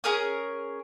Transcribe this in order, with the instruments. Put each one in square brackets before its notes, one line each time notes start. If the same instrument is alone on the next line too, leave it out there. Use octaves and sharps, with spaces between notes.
[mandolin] C#4 G#4 A#4 D#6